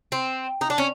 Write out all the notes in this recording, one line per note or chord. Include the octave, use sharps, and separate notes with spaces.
C4
D#4
D4
C#4